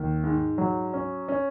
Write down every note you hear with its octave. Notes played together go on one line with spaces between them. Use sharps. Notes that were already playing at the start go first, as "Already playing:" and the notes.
Already playing: D#2
G#2
F#3
C#4
C#4